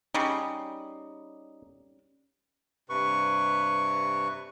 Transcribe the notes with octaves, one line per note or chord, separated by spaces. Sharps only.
C#3 G3 D#4
G2 C3 B4 C#6